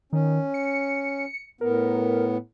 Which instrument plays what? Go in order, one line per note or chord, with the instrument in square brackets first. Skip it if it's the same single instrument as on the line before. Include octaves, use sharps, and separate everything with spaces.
[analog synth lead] D#3 [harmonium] C#4
[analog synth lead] C#7
[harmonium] A2 B3 [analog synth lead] A#4